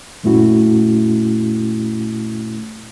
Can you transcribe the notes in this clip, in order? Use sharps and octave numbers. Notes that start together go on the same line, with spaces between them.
F#2 A#2 A3 C#4 E4 F#4